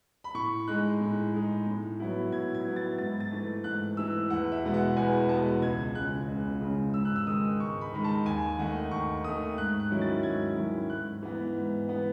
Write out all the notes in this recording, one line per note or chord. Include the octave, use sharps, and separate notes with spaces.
B5
A2 C#6
G#3 D#4 F#6
A2
G#3 D#4
A2
F#3 B3 E4
A2 G#6
G#6
F#3 B3 E4
A6
G#2 A6
A6
E3 A3
G#2 F#6
E3 A3 E6
E2 F#5
E5
B2 G#3 B3
F#5
E2 G#5
B2 G#3 B3 A5
C#2 G#6
C#3 G#3 F#6
C#2
C#3 G#3
G#2 E6
F#6
E6
D#3 G#3 D#4 D#6
G#2 C#6
B5
D#3 G#3 D#4
A5
D#2 G#5
D#3 A3 D#4 F#5
D#2 C#6
D#3 A3 D#4 D#6
G#2 F#6
F#6
D#3 F#3 C#4 E4
A6
G#2 G#6
D#3 F#3 C#4 E4
G#2 F#6
E3 B3
G#2
E3 B3